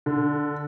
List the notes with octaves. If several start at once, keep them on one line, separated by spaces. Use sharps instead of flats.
D3